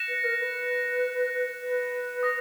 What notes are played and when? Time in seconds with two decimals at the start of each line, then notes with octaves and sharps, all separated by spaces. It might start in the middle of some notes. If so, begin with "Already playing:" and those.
Already playing: F#6 A#6 C#7 E7
0.09 B4
0.24 A#4
0.39 B4
1.62 B4
2.23 D#6 A#6